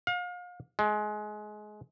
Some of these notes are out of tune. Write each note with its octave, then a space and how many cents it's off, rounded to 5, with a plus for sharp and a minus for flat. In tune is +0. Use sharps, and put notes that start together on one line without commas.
F5 +35
G#3 +25